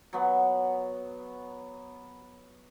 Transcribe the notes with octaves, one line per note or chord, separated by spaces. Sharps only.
F#3 B3